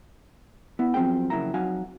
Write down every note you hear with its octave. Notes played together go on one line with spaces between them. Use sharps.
B3 E4
F#2 F3 C4 C#4 G#4 G5
F2 C#3 F#3 A#3 E4 A#5
F2 F#3 D#4 F#4 F5 G#5